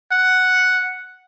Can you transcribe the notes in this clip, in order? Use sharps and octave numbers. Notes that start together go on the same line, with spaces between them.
F#5